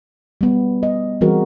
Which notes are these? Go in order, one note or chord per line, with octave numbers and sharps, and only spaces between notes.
G3 B3
D#5
E3 G3 C4 F#4 G#4 A#4